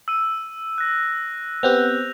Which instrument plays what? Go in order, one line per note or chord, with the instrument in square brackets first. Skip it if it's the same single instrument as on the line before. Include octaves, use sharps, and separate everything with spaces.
[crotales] E6 D#7
F#6 A#6
[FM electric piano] B3 C4 G4 [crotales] F#6 G6 F7